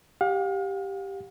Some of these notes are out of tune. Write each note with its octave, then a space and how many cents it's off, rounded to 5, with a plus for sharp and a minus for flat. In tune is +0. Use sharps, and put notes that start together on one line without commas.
G4 +0 F5 +40